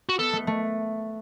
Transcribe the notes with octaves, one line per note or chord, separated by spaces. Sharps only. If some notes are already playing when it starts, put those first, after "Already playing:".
F#4
B3 A4
A3
A3